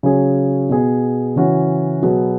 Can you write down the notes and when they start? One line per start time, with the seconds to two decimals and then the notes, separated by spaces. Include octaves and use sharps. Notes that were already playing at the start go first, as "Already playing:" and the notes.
0.03 C#3 F#3 C#4 G#4
0.69 B2 B3 G#4
1.36 C#3 E3 C#4 F#4
2.02 B2 F#3 B3 G#4